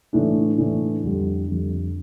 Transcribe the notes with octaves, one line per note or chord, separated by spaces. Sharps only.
A2 E3 A3 D4
A2 E3 A3 D4
F2 D3 G3
F2 D3 G3